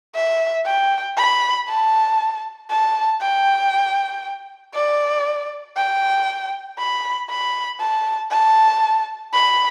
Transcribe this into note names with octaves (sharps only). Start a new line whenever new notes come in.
E5
G5
B5
A5
A5
G5
D5
G5
B5
B5
A5
A5
B5